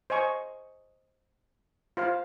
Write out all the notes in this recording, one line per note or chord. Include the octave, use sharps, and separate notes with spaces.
C5 D#5 G#5 C#6
F4 C5 F5